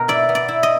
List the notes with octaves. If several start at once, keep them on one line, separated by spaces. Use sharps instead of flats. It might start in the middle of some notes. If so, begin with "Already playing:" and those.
Already playing: B2 A#4
E4 D5
B3
D5
E4
D#5